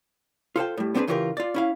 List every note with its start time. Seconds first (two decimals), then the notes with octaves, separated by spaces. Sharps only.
0.56 F4 A4 C5 G5
0.77 A2 G3
0.95 B3 C4 D4 F#4 G#4 B4
1.08 C#3 E3 F4 G4 A4 A#4
1.37 F4 D5
1.54 C#4 E4 F5